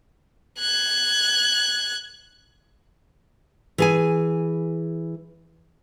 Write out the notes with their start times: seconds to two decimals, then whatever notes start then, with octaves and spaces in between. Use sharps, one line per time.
0.59 F#6 G#6
3.78 E3 G#4 G#5